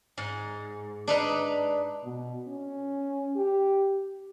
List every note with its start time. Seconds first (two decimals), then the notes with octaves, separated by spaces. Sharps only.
0.18 G#2
1.07 D4 D#4 B4
2.05 B2
2.48 C#4
3.36 G4